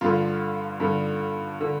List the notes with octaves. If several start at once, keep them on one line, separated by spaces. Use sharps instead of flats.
G2 D3 F4
G2 D3
D3